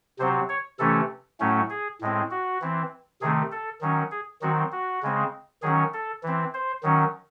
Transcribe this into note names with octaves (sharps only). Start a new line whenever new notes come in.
C3 F#3 C4 C5
C#5
C3 E3 A3 C#4 A4
A2 F#3 A3 C#4
G#4
A2 G#3 C4
F#4
E3 C4
C3 D#3 A3 C4 G#4
A4
D#3 F#3 C#4
G#4
D#3 F#3 C4 F#4
F#4
C#3 G#3 C4
D#3 F#3 C#4 G#4
A4
E3 C4
C5
D#3 F#3 C#4